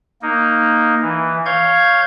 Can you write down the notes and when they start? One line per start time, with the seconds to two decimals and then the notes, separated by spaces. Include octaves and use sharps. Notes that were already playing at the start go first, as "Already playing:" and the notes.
0.22 A#3 D#4
1.02 E3
1.45 C#5 F5 G6 G#6